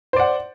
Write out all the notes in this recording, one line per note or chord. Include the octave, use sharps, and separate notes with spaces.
C5 D5 F#5